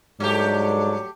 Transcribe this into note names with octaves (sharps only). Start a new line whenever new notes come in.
G#2 F#3 G3 A3 D4 G4